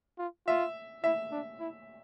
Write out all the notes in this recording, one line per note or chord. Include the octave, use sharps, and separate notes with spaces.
F4
F4 E5
E4 E5
D4
E4